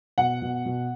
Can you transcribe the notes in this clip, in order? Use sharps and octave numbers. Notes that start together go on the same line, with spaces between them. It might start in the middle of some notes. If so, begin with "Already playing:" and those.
B2 F#5
B2
B2